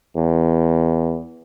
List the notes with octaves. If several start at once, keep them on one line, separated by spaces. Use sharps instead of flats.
E2